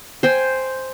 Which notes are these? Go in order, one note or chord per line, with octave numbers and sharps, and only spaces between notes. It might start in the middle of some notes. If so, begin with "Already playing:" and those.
C5 G5 G#5